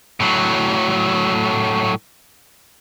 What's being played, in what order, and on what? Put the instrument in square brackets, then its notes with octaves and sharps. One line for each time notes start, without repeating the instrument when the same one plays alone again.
[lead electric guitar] A2 F#3